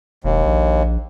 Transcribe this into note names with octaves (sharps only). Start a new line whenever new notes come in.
E1 D#2
A#1